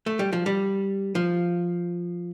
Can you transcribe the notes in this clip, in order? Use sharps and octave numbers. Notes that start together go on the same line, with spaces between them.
A3
G3
F3
G3
F3